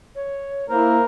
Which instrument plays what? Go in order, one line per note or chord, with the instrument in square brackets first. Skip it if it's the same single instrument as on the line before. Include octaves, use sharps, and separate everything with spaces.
[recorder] C#5
[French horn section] A#3 [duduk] E4 [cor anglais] A#4 [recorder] C5